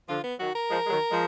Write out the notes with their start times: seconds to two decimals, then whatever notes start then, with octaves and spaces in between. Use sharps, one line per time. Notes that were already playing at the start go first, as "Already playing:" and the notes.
0.08 D3 F3 F4
0.24 B3
0.39 D#3 F#3 F#4
0.55 A#4
0.70 F3 G#3
0.86 G#3
0.90 D#3 F#3
1.11 F3 G#3